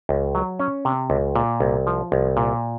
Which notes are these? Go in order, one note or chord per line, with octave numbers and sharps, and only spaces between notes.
C#2
F#3
C#4
C3
C#2
A#2
C2
F3
C2
A#2